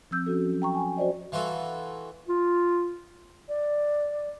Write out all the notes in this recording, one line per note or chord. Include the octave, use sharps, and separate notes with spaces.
F3 C4 E6 G6
C#4 F#4 A4
F#3
G5 A#5 C#6
G5 G#5
F#4 C5 D5 D#5
E3 F4 F#4 A4
F4
D5